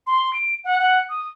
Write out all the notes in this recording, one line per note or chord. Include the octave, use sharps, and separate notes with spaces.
C6
D7
F#5
F#5
D#6